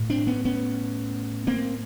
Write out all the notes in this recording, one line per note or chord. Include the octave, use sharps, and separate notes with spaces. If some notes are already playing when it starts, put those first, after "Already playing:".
Already playing: A2
C4 D4
B3 C#4
B3 C#4
A#3 C4